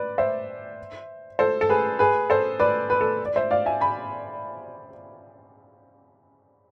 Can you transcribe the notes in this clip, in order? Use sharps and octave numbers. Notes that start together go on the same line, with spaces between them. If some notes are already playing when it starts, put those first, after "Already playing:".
Already playing: B4 D5
C5 E5
A4 C5
A4
G#4 B4
G#4 B4
A4 C5
B4 D5
B4
A4
D5
C5 E5
D5 F5
E5 G#5
G#5 B5